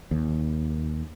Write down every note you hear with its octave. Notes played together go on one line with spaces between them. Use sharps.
D#2